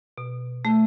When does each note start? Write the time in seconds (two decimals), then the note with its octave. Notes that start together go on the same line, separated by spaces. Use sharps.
0.18 B2
0.65 A3